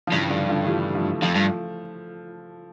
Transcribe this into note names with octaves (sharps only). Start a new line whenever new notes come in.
F3
G2 C#3 E3
D3 F3
D3 F3
A3
E3 G3
F3 A3
F2 F3 A3
G2